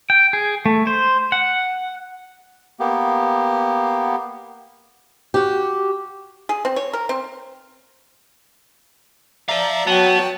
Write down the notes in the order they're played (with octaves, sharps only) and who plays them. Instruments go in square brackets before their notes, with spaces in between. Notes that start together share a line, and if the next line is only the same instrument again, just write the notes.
[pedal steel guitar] G5
G#4
A3
C5
F#5
[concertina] A#3 B3 G4
[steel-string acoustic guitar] F#4 G4
[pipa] G#4
C4
C#5
A#4
C4
[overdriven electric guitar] C5 F5 [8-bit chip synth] D5 E5 A#5
[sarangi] F#3 [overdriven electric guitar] B3 [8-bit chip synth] G5 A5